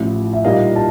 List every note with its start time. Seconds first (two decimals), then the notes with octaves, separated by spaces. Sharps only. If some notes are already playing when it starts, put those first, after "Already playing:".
Already playing: A1 A2 F3
0.33 E5
0.44 A#2 G3 A#3 D#4 D#5 F5
0.76 A5